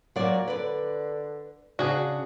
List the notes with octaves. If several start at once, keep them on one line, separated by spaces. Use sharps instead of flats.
A#2 F#3 D5
D3 B4 D5
C#3 D4 F#4 G#4